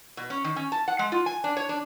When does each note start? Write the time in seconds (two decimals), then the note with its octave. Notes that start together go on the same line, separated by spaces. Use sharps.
0.17 B2
0.30 C#4
0.44 D#3
0.56 C#4
0.72 A5
0.88 F#5
0.99 G#3
1.12 F4
1.26 G#5
1.44 D4
1.57 C#5
1.69 D4